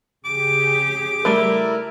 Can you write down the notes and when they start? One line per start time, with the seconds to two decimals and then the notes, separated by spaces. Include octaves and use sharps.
0.25 C#3 G4 G#4 D6
1.25 G3 A3 E4 A#4